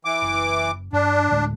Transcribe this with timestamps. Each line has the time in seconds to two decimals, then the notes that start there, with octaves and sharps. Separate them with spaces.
0.05 E3 D6
0.22 F#1
0.93 G2 D4
1.31 D2 A2 G#3